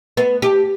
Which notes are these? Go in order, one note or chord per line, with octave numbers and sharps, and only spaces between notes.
B3
G4